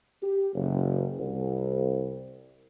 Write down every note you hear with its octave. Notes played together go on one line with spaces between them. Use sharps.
G4
F#1
C2